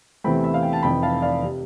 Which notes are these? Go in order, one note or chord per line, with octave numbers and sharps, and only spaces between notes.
E2 C3 E3 A3 C4 G5 B5
E5
F5
G5
A5
F1 F2 E3 G5 B5
F5 A5
D5 F5
C3